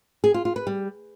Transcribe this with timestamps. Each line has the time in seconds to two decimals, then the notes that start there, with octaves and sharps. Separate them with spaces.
0.24 G#4
0.34 F4
0.45 F4
0.56 B4
0.67 G3